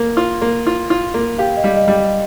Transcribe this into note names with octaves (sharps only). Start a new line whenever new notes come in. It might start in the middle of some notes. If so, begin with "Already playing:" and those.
Already playing: A#3
F4
A#3
F4
F4
A#3
G4 F5
D#5
G3
D#5
G3